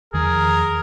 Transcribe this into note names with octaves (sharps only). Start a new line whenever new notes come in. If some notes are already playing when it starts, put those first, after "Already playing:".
E2 D#3 F3 G#4 A#4